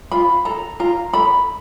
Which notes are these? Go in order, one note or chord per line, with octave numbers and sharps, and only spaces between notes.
F4 B5
A4 A#5
F4 A#5
A4 B5